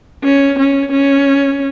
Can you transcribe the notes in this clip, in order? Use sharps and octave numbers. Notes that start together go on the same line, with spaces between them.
C#4
C#4
C#4